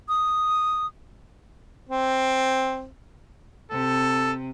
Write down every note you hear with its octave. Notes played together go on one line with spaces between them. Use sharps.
D#6
C4
C3 A4